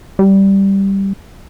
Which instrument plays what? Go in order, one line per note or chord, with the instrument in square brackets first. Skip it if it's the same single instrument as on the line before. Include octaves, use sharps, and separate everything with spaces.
[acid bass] G3